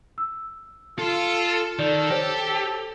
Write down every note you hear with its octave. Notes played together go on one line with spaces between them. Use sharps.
E6
F4 A4
D#3 A4 D5 F7
G4 C5 C#5